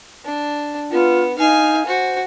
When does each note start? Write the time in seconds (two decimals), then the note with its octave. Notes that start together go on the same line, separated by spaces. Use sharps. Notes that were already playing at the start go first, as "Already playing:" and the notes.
0.25 D4
0.90 B3 F4
1.38 D#4 F5 G#5
1.87 F#4 C5